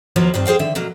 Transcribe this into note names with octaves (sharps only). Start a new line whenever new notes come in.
D#2 F3 F#3 A#3 B3
G2 D#3 C4 F4
G#4 C5 F5 G5
D3 D#3 E5
B2 F#3 A#3